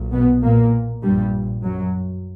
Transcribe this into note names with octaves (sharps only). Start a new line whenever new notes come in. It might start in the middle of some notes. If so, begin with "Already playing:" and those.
Already playing: B1 A#2
B2 B3
A#2 A#3
A#1 G2 A#2 G3
F#2 F#3